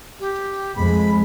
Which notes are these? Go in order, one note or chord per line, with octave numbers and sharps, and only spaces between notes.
G4
F2 G#3 B5